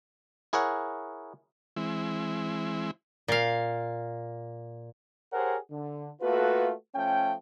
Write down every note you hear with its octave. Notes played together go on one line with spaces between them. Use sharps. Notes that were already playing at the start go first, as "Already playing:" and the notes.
E4 G#4 A#4 C#5 F#5
E3 G#3 C4 E4
A#2 F5
G4 G#4 A#4 C5 C#5 F#5
D3
A3 A#3 F4 F#4 A4 B4
F3 A3 C#4 G5